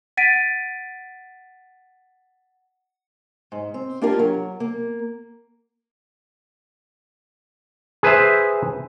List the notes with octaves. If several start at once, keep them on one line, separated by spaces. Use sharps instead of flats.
F#5 A6 B6 D7 D#7
G#2
C4
A#3 D4 F4 G4 A#4 F5
F#3
A#3
G#4 B4 C5 E5